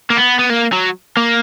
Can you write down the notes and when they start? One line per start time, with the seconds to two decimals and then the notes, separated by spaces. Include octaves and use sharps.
0.10 A#3
0.17 B3
0.39 B3
0.50 A#3
0.72 F#3
1.17 A#3